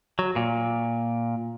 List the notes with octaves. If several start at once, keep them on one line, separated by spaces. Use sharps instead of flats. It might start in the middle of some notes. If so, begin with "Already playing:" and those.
F#3
A#2